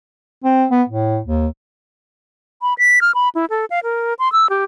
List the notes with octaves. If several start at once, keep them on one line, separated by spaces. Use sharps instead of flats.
C4
B3
A2
D#2
B5
B6
F6
B5
E4
A4
F5
A#4
C6
E6
G4